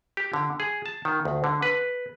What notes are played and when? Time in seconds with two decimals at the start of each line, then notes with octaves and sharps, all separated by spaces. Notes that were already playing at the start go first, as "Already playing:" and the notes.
0.17 G4
0.33 D3
0.60 G#4
0.86 A5
1.05 D#3
1.25 D2
1.44 D3
1.62 B4